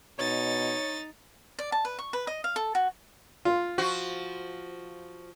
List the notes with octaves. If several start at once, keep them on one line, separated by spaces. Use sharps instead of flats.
B2 D#4 C#5 A6
D5
A5
B4
C#6
B4
D#5
F5
A4
F#4
F4
F3 F#4